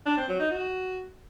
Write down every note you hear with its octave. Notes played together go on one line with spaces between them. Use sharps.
D4
C4
F#3
D#4
F#4